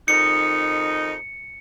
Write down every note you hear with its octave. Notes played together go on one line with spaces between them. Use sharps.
F2 D#3 D#4 C#7